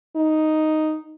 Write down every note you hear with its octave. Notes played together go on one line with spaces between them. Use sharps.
D#4